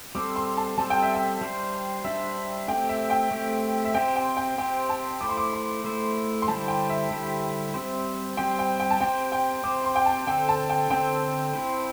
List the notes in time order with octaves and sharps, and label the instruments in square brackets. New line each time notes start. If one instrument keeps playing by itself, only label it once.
[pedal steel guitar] G3 C4 A4 C5 [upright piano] D6
[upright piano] C6
A5
[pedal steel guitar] G3 C4 A4 C5 [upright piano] A5
[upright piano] G5
E5
G5
[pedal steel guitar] G3 D4 C5
[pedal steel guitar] G3 D4 C5 [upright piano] E5
[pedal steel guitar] A3 C4 G4 [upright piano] G5
[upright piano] E5
G5
[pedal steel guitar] A3 C4 G4
[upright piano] E5
[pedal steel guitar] C4 G4 C5 [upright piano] G5
[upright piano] G5
G5
[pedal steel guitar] C4 G4 C5 [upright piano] G5
[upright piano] A5
[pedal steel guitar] A3 E4 C5 [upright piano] D6
[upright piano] C6
D6
C6
[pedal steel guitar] A3 E4 C5
[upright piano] C6
[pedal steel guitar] D3 G3 E4 G4 C5 [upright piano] A5
[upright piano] G5
E5
[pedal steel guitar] D3 G3 E4 G4 C5
G3 C4 G4 C5
[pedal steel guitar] G3 C4 G4 C5 [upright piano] G5
[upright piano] G5
G5
A5
[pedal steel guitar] C4 G4 C5 [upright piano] G5
[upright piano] G5
[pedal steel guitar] C4 G4 C5 [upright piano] D6
[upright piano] C6
G5
A5
[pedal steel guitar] D3 C4 A4 C5 [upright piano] G5
[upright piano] A5
G5
[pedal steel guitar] D3 C4 A4 C5 [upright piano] G5
[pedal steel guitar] C4 E4 C5